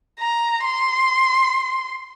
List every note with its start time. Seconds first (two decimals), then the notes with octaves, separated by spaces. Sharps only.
0.20 A#5
0.64 C6